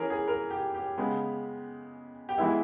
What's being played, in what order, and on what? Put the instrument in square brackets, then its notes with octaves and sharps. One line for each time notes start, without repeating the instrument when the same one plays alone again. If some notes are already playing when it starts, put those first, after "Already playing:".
Already playing: [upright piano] E3 C#4 G#4 A#4
G#4
A#4
G4
G4
C#3 G#3 B3
G4
E3 G#3 B3 E4